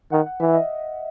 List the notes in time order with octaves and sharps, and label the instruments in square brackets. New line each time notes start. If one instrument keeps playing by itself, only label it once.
[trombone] D#3 [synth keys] F#5
[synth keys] F#5
[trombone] E3 [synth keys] E5
[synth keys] D#5